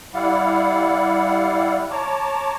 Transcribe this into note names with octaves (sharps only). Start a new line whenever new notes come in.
G3 E4 D5 F5 F#5
C#5 A5 A#5 D6